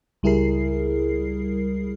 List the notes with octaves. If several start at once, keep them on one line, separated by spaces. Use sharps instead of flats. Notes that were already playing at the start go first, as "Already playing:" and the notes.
C#2 G3 E4 G#4 A#4 C7